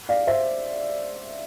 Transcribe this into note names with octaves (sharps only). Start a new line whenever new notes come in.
D5 F5
C5 E5